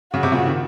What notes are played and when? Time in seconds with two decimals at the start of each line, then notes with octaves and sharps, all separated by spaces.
0.13 C#3 F#4
0.23 C3
0.32 A#2 C#3
0.46 D#3